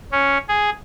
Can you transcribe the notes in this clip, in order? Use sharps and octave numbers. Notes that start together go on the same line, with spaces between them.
C#4
G#4